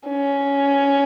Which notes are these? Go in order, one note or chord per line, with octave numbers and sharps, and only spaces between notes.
C#4